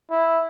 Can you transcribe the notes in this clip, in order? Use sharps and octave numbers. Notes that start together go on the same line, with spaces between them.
E4